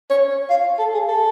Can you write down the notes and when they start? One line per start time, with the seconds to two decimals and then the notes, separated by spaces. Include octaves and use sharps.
0.10 C#5
0.50 F5
0.79 A4
0.94 G#4
1.08 A4